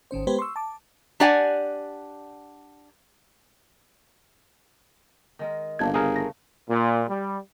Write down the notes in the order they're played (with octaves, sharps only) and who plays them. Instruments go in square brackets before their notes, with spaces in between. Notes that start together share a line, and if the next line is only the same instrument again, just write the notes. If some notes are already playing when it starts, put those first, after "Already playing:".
[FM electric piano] G#1 D#3 C#4 C5
G#3 B3 G4 B4 C5
C6 C#6 E6
A5 D6
[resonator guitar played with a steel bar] D4 G4 D5 F#5 G#5
[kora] D#3 G#3 A#4
[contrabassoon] G1 [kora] C#3 A3 A#3 [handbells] D4 A5 G#6
[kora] C#3 A3 B4 [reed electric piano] G#4 A#4
[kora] A3 [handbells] A#6
[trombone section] A#2
G3